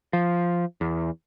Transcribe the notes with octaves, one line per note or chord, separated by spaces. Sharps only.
F3
E2